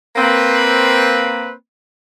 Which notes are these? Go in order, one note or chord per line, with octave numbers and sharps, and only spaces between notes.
A#3 C4 B4